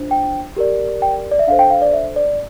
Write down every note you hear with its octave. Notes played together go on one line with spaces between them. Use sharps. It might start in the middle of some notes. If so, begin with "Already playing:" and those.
Already playing: D4 F4 C5
G5
G4 A#4 D5
G5
D5
E5
D4 A4 C5 F5
G5
F5
D5
E5
D5